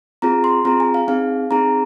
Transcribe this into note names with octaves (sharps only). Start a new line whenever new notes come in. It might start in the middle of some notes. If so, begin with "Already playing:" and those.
C4 F4 G#4 A#5
C6
C4 F4 G#4 A#5
G#5
F5
C4 D#4 G#4 F5
C4 D#4 G#4 A#5